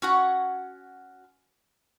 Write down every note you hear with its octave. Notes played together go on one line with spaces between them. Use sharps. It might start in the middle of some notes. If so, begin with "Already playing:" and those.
C#4 F#4 F#5